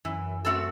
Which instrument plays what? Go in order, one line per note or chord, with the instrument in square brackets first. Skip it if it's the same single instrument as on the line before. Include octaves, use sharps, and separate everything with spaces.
[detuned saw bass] F#2 [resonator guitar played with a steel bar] E3
[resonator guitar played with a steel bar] A3 C4 F#4 A4